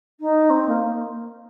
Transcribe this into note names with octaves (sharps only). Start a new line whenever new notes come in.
D#4
C4
A#3